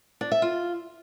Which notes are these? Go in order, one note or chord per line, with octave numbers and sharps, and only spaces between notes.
D4
E5
F4